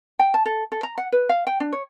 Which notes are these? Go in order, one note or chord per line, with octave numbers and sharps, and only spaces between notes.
G5
A5
A4
A4
A#5
F#5
B4
F5
G5
D4
C#5